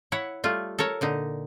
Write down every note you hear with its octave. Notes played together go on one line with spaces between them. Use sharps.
E4 C#5 F#5
G3 A3 F4
A4 A#4 C#5
A#2 D3 D#4